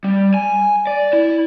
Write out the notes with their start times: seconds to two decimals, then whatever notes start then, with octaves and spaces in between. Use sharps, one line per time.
0.04 G3
0.34 G#5
0.87 D5
1.13 E4